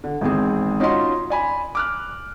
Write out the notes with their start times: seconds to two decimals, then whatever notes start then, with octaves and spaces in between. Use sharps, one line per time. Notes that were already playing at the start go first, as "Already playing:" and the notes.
0.04 D3
0.21 G#1 E2 C4 G#4
0.80 C#4 D#4 F4 F#4 D#5 C6
1.30 D5 G#5 B5
1.75 D6 F6 F#6